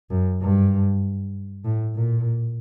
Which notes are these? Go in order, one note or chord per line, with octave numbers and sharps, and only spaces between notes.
F#2
G2
A2
A#2